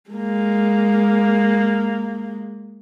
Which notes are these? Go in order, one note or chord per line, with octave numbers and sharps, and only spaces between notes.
G#3 A#3